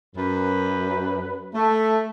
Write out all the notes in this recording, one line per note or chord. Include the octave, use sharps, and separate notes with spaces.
F#2 B4
A3